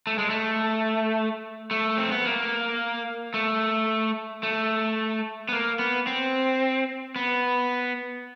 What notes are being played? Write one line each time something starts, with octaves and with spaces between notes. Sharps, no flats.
A3
G#3
A3
A3
C4
B3
A#3
A3
A3
B3
A#3
B3
C4
B3